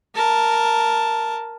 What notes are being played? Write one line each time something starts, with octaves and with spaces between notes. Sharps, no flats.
A#4 A5